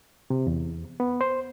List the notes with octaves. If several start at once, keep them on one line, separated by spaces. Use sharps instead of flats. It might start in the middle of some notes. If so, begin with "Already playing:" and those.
C3
E2
B3
C5